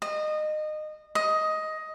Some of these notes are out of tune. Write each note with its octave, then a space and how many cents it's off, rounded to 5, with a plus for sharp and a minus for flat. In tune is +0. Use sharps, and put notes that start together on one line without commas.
D#5 -25
D#5 +10